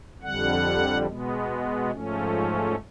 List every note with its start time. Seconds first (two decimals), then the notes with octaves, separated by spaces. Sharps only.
0.22 F2 D3 G3 F#5
1.07 B2 G#3 B3
1.91 G#2 F3 A3 C#4